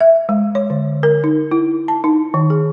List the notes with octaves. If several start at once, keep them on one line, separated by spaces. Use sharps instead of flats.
E5
G#3
C#5
D3
A#4
D#4
E4
A5
D#4
D#3
G#4